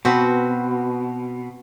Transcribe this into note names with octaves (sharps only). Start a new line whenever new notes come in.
B2 C4 F#4 B4